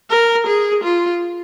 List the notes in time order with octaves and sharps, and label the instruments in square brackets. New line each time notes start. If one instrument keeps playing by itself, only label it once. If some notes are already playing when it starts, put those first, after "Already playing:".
[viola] A#4
G#4
F4